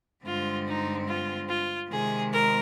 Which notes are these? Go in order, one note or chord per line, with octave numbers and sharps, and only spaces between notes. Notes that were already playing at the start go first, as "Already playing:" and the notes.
G2 D3 G#3 C4 F4
D#4
F4
F4
C3 D#3 G#3 G#4
A#4